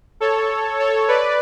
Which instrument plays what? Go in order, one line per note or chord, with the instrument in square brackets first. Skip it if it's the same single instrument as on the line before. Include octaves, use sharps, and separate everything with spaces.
[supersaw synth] A4 C#5
A4 C#5
B4 D5